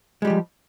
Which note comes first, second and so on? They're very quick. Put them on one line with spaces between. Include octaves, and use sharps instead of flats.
G#3 G3 G4 F3